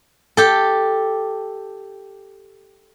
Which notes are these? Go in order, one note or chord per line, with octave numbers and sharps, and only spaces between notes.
G4 A4